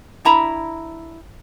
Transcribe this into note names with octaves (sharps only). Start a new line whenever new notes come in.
D4 E4 A#5 B5